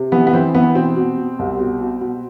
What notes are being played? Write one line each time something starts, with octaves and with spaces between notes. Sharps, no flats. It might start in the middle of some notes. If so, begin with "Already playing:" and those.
Already playing: C3
E3 B3
B3
E3 C4
E3 B3
B2 C4
B2
B2
C2
B2
B2
B2